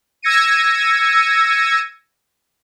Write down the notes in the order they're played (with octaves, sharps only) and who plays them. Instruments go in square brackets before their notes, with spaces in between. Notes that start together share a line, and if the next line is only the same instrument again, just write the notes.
[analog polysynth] E6 G#6 A#6 C#7 D#7